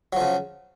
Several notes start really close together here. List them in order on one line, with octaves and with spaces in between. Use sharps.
F#3 F3 C#3